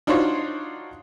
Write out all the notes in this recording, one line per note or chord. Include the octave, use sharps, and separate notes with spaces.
D4 D#4 F4 F#4 C5 C#5